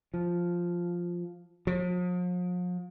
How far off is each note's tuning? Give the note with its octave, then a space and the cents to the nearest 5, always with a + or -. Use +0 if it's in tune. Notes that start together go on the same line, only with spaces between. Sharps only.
F3 +0
F3 +45